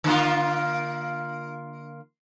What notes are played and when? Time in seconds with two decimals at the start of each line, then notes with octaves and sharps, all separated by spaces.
0.04 D3 A#3 F4